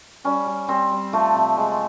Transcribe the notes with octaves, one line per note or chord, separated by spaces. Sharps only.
G3 C#4
G3
G3 C4
G3
F3 A3
C3
G#3